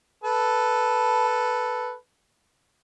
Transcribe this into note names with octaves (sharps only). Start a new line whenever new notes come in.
A4 B4